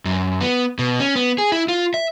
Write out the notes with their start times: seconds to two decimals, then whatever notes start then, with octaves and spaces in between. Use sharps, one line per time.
0.05 F#2
0.41 B3
0.79 B2
1.00 C#4
1.15 B3
1.38 G#4
1.52 E4
1.68 F4
1.94 E5